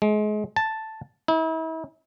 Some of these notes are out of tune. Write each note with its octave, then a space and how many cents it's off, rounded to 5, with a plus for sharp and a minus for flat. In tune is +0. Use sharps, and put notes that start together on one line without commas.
G#3 +30
A5 +0
E4 -40